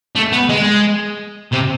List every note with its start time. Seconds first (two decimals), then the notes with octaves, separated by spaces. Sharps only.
0.15 A3
0.32 B3
0.49 G#3
1.53 C3